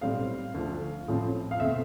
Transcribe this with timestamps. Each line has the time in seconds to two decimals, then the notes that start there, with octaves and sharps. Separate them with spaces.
0.01 B1 A2 G3 C4 F5
0.54 D2 D3 F3 A3
1.08 A1 A2 F3 C4
1.51 F5
1.60 B2 A3 C4 E5